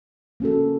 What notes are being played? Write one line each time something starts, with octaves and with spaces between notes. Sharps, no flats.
A#3 C#4 F#4 A4